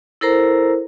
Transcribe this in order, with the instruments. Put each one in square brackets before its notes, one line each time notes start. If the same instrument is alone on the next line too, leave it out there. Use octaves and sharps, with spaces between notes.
[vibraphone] E4 A4 A#4 C5 A#5